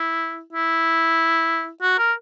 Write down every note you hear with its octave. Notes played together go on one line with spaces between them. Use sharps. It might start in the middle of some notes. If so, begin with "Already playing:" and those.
Already playing: E4
E4
F#4
A#4